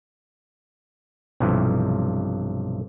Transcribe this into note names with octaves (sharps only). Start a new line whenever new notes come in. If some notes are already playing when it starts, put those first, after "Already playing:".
B1 G2 C3 E3 F3